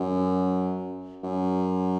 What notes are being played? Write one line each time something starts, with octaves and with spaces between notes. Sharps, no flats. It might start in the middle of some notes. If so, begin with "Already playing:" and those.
Already playing: F#2
F#2